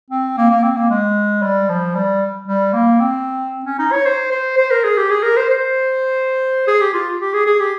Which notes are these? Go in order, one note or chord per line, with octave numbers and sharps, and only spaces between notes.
C4
A#3
A#3
C4
A#3
G#3
G3
F3
G3
G3
A#3
C4
C#4
D#4
C#5
C5
C5
C5
A#4
G#4
G4
G#4
A#4
C5
C5
G#4
G4
F4
G4
G#4
G#4
G4